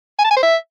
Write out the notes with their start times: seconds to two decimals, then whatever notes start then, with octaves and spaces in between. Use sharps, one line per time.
0.18 G#5
0.24 A5
0.30 G#5
0.36 C5
0.42 E5